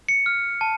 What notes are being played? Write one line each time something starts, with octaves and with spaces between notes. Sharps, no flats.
C#7
F6
A5